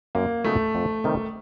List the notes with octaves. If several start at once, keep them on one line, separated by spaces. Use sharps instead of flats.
F#2 A#3
C#3 F#3 A3 B3 D#4
F2
C3 D#3 G3